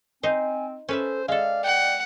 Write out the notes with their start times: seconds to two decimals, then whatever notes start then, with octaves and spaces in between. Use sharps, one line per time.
0.23 C4 D#4 C5 G#5
0.89 C#4 A4 B4 C5 E5
1.28 G#3 A4 D5 F5
1.64 F#5 G5